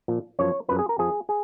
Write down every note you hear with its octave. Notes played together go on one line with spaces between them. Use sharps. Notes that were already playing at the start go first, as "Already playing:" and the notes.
A#2 F3
F#2 F3 C#5
F#2 F3 B4
G#4
A#4
F2 F3 G#4
G#4